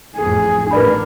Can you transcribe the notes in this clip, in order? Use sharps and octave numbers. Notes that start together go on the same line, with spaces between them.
A1 F2 A2 G#4
A1 G2 D4 A#4 B4 D5 B5